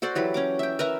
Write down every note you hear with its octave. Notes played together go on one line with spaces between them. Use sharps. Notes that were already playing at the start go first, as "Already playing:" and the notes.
F#4 A4 C5 D5
E3 F#3 G4 B5
C#4 A#5 D6
E5 G5
A#4 B4 E5 A#5